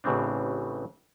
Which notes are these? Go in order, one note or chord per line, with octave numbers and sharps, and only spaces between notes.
A1 A2 C#3 E3 C4 D4